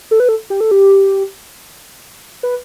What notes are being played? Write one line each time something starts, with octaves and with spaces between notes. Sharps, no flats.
A4
B4
A4
G4
A4
G4
B4